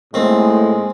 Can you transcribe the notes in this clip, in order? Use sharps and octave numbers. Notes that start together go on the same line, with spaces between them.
D#2 A2 G#3 C4